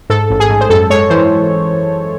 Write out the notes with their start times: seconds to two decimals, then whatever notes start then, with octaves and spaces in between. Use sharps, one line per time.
0.10 G#2 A4
0.30 A1
0.40 G#4
0.50 G#2
0.61 C5
0.70 F#2 A4
0.90 G#3 C#5
1.10 E3 C5